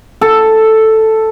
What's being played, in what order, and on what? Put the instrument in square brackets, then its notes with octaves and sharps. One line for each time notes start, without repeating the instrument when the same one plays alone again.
[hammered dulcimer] A4